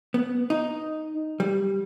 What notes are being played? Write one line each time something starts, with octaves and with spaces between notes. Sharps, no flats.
B3
D#4
G3